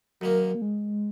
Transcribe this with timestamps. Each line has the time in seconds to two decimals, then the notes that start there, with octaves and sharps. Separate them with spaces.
0.20 F#2 D#3 F#3 A#3
0.55 A#3
0.62 G#3